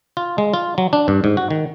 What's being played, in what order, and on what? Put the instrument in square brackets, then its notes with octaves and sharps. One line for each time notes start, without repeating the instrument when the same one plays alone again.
[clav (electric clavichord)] F4
G#3
F4
F#3
D4
G2
G#2
F#4
D#3